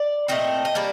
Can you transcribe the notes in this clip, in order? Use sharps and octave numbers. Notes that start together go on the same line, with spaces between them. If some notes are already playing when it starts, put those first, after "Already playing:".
Already playing: D5
A#2 A3 C4 D#5
D#5
G3 A#3 D5